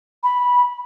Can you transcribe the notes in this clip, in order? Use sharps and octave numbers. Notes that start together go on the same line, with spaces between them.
B5